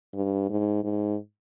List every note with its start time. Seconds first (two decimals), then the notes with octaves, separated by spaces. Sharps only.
0.14 G2
0.49 G#2
0.84 G#2